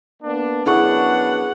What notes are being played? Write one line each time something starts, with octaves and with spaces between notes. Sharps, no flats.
A#3 B3 D4
F#2 B3 D4 E4 G#4 F#5 C#6